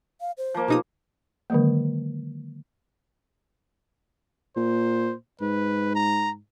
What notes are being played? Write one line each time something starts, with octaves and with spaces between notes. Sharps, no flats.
F5
C5
F3 A#3
B2 D#4 G4 D#6
D3 D#3 F#3 G#3 A#3
A#2 C5
G#2 B4
A#5